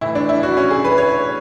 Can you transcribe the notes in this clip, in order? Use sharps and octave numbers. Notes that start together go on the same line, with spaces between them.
A2 E3 E4
D4
E4
F#4
C#4
G#4
B4
C#5